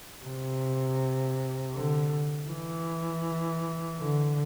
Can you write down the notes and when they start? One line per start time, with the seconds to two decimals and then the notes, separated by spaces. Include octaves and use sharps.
0.25 C3
1.74 D3
2.49 E3
4.00 D3